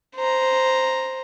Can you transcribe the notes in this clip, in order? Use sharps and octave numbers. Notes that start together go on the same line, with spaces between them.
C5 A#5